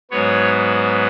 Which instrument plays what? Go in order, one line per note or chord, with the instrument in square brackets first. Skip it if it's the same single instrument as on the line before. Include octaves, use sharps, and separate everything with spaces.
[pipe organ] G#2 F#3 B3 C#5